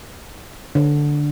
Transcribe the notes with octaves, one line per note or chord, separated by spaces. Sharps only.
D3